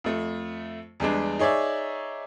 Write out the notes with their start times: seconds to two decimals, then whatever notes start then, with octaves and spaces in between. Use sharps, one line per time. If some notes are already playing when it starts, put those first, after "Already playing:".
0.04 F2 A3
1.00 E2 G3 G#3 D4
1.39 D#4 G#4 C#5 D5 E5